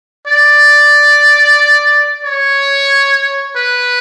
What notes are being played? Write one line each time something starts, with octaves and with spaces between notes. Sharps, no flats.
D5
C#5
B4